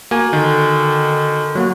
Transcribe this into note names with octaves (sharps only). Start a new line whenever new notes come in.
A#3 F#4 G#5
D3 D#3
F#3 A#3 F#4